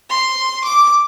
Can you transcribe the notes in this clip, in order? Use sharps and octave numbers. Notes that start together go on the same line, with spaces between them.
C6
D6